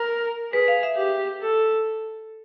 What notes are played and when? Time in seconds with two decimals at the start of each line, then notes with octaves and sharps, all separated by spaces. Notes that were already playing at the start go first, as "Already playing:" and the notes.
Already playing: A#4
0.53 G#4 B4
0.68 F5
0.83 E5
0.97 G4
1.42 A4